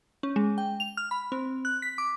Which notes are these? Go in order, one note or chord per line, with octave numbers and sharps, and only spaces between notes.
C#4
G#3
G5
F7
F6
B5
C4
F#6
B6
D6